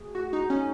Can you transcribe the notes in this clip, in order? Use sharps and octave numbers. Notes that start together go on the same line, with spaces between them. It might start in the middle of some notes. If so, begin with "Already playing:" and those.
Already playing: A3 F#4 G#4
F#4
D#4
C#4